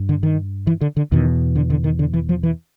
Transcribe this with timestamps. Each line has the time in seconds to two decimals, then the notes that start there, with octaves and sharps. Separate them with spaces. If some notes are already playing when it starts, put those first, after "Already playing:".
Already playing: G2
0.09 D3
0.23 D#3
0.67 E3
0.81 D3
0.97 D3
1.12 E2 B2 D#3
1.55 D3
1.70 D3
1.84 D#3
1.99 D3
2.14 E3
2.29 F3
2.43 E3